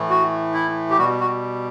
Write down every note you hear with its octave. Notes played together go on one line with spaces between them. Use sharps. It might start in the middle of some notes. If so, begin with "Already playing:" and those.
Already playing: A2 E3 A3
F#4
E4
G4
B2 G3 F#4
F#4